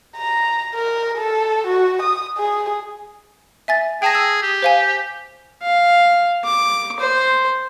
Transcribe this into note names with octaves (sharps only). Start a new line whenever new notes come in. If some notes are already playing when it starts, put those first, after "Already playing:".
A#5
A#4
A4
F#4
D#6
G#4
E5 G#5 A6
G#4 G5 A5 A#6
E6
G4
C5 F5 G#5
F5
D6
C5